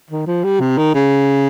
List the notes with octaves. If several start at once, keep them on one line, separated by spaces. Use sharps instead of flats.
D#3
F3
G3
C3
D#3
C#3